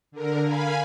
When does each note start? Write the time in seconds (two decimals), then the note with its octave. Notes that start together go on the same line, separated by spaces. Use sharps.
0.12 D3 A#4
0.43 F5 G#5 B5